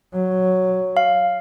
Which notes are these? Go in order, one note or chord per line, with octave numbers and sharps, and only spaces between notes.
F#3
F5